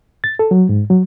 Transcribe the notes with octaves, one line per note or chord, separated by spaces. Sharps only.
A6
A4
F#3
G#2
F#3